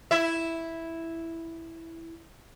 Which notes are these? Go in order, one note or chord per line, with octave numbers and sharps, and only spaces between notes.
E4 E5